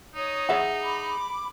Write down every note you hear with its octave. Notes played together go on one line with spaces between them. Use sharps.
D#4 C#5 D#6
G#4 E5 F#5
B5 D6